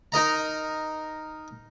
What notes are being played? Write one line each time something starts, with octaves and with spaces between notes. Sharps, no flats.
D#4 A#4 D#5 A#5